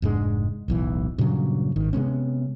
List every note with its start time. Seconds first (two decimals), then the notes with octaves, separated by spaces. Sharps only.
0.02 F1 G#2 G#3 D4
0.68 D1 B1 E3
1.18 G2 A#2 C#3 F#3
1.76 G#1 D#3
1.93 C3 G#3 B3 C#4